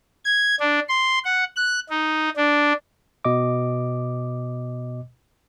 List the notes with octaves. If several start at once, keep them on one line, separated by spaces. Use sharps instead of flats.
G#6
D4
C6
F#5
F#6
D#4
D4
B2 D#5 D6